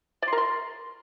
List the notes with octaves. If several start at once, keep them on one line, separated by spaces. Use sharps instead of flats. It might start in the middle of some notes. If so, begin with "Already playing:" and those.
D5
C6
A#4
C6